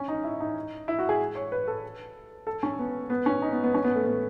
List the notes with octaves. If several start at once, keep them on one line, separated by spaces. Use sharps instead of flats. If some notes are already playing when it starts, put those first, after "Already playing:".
Already playing: C#4
D#4
E4
D#4
E4
F#4
G#4
C#5
B4
A4
A4
C#4
B3
B3
C#4
D#4
B3
B3
C#4
B3
A3
B3